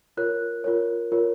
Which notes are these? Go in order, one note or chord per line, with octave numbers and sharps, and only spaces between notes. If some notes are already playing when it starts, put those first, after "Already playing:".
F4 A#4 C#5 F#6
F4 A#4 C#5
F4 A#4 C#5